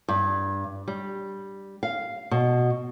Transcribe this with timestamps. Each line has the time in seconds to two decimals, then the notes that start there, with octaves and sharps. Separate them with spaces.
0.09 G2
0.88 G3
1.83 F5
2.31 B2